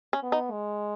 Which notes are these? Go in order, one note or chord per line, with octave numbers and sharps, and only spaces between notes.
C#4
B3
D#4
G#3